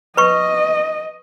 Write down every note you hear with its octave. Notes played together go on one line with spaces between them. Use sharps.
B4 D#5 C#6